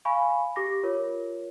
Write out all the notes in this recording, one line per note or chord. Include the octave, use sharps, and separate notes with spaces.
F5 G#5 B5 C#6
G4 D6 A#6
F4 A#4 C#5